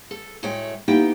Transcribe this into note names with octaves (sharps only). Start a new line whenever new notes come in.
A4
A2 G#3 A3 F#4 C#5 G5
A#3 B3 D#4 E4 G4 G5